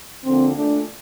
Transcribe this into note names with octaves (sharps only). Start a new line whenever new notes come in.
D2 D3 F3 A#3 C4
A#2 A3 D4